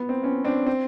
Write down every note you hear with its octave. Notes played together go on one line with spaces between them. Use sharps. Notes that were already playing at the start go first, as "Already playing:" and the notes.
Already playing: B3
C4
B3 C#4
C4 D4
C4